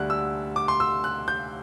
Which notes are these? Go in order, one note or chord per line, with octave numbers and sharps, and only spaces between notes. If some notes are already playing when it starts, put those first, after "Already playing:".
Already playing: D2 D3 G3 F#6
E6
D6
C6
E6
F#6
G6